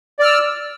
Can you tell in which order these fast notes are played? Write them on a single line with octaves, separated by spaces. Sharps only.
D5 F6 E6